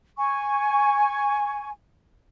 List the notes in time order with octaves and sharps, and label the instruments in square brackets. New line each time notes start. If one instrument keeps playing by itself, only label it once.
[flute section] G#5 C#6